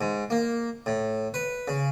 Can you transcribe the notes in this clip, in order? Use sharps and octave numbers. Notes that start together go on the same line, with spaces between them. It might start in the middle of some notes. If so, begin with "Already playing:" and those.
G#2
A#3
A2
B4
C#3